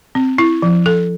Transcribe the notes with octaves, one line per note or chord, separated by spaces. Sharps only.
C4
E4
F3
A4